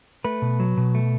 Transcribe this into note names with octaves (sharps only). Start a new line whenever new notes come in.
A3 B4
B2
F#3
B2
A3